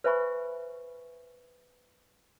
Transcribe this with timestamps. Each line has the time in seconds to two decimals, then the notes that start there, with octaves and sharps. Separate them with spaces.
0.04 B4 C5 E5 G#5 B5 C#6